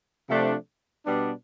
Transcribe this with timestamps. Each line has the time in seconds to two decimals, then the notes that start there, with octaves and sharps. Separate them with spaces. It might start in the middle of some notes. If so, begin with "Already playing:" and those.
0.28 C3 F3 A3 D4 A4
1.04 B2 G3 B3 D4